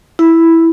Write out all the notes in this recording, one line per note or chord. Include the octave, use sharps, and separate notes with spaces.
E4